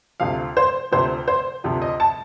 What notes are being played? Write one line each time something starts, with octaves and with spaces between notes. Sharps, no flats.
D2 C3 F3 F5
C5
D2 C3 F3 C5
C5
D2 C3 F3
D#5
A5